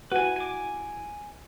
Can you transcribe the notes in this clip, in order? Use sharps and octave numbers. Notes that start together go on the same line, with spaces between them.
E4 F#4 B4 G#5
G#5 D6